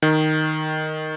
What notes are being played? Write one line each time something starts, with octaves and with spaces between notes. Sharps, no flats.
D#3